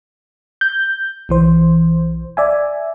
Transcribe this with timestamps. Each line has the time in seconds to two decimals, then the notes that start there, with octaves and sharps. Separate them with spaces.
0.61 G6
1.29 B1 E3 C5
2.37 D5 E5 G#5